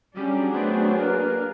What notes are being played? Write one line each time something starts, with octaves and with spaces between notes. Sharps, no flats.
F#3 G3 C#4 D4 G#4
A3 B3 C4
A#3 B4